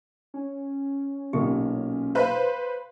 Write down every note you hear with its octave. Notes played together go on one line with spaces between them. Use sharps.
C#4
B1 A#2 G4
B4 C5 F5